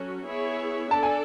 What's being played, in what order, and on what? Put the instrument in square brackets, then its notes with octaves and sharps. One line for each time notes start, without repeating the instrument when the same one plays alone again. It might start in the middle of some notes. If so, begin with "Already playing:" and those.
Already playing: [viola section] F#3 C#4 F#4 A4
B3 E4 G#4 C#5 E5
[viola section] D4 A4 D5 [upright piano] A5
[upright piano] G#5